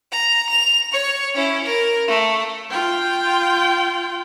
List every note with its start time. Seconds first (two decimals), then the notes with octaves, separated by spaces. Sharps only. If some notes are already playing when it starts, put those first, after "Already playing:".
0.12 A#5
0.50 F7
0.92 C#5 C#6
1.35 C#4 E4
1.64 A#4
2.08 A3
2.70 F4 G5